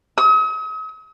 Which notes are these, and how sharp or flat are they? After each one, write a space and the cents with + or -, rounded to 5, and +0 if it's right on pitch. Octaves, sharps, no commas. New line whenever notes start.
D#6 +45